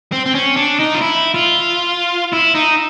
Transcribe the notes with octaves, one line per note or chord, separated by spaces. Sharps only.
C4
C4
C#4
D4
D#4
F4
E4
F4
E4
D#4